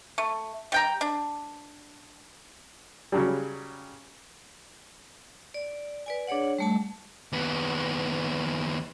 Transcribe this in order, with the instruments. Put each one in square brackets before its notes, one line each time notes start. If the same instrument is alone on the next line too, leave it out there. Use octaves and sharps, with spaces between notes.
[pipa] A3
G3 G5 A#5
D4
[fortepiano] C#3 F#3 G3
[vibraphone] D5
B4 D5 G#5
D4 G#4 C#5 D5 F#5
G3 A3 A5
[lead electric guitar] D#2 B3